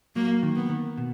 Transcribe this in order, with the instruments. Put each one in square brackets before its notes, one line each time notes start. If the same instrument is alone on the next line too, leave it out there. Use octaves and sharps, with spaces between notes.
[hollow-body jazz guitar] F#3 [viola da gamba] A#3
[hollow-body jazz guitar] D#3
[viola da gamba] B3
[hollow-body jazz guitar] D#3
B2